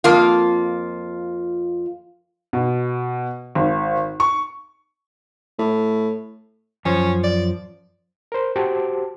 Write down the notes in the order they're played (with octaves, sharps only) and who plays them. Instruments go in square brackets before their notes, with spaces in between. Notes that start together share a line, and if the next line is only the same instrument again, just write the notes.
[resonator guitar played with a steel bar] F2 A#3 F4
[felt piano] B2
G#1
C#6
[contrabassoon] A2
[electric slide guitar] F#2 F3 C5 [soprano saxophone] C#4
[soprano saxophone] D5
[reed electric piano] A#4 C5
F#4 G4 C5 A5 D6